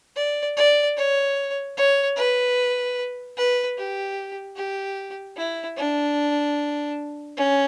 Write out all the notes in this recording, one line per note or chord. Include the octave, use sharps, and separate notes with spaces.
D5
D5
C#5
C#5
B4
B4
G4
G4
E4
D4
C#4